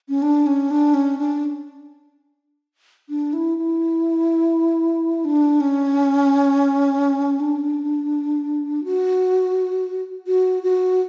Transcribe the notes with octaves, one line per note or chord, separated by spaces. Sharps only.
C#4
D4
C#4
D4
C#4
D4
D4
E4
E4
D4
C#4
D4
F#4
F#4
F#4